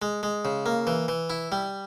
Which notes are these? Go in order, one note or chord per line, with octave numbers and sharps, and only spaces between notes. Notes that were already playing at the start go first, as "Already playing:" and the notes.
G#3
G#3
C#3
A#3
E3
E3
E4
G3